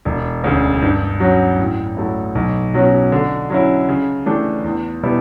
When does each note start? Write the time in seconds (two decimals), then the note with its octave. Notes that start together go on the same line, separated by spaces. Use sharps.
0.05 E1
0.44 D2 C#3
0.82 G2
1.20 F#3 C#4 F#4
1.59 A2
1.97 F#3 A3 E4
2.35 B1
2.74 B2 F#3 C#4 F#4
3.12 D3
3.50 F#3 C#4 E4
3.89 C#3
4.26 E3 A3 D4 G4
4.64 E2
5.03 B2 G3 B3 E4